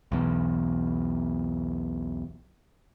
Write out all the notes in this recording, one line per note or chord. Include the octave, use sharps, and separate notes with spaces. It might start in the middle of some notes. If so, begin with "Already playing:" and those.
B1 E2